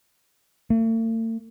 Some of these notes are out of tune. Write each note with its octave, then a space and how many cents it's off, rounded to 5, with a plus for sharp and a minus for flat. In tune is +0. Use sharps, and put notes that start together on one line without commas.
A3 +45